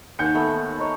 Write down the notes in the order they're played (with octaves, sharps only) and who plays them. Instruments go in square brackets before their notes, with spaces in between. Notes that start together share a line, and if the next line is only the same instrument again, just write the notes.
[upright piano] D#2 G6 C#7 [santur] F#5 G#5
[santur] A3 B3 E6
D#4 C#5